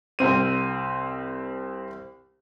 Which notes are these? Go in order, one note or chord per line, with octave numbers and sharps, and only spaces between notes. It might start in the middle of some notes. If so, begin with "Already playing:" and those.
C2 C4 D#7